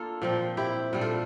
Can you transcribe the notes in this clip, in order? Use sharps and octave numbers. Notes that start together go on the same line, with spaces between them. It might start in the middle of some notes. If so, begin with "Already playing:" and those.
Already playing: A#3 D4 F4 A4
A#2 F3 C4
E4 G4
A#2 G3 D4
F4 A4